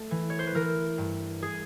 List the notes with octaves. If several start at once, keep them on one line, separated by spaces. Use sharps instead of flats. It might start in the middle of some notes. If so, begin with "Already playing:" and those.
Already playing: A3 A4
E3
C#5
C5
B4
E3 A#4
G2
G#4